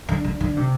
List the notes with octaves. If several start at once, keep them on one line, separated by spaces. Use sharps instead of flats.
D3
D3
D3
C3